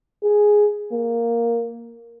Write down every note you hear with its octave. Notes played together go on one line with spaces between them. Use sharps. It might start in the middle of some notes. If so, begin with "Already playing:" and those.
G#4
A#3